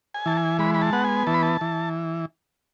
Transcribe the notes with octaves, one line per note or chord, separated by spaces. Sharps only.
G#5
E3 A5
G#5
G#3 B5
B5
A5
B3 F#5
G#5
E3 A5
B5
A5
E3